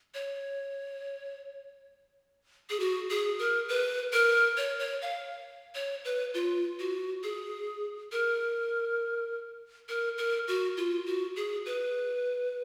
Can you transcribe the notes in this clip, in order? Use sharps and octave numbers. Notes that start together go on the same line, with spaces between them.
C#5
G#4
F#4
G#4
A#4
B4
A#4
C#5
C#5
F5
C#5
B4
F4
F#4
G#4
A#4
A#4
A#4
F#4
F4
F#4
G#4
B4